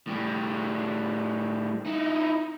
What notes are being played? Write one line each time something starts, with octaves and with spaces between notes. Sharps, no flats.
A2 G3
D#4 E4